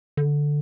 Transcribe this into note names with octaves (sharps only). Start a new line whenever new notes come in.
D3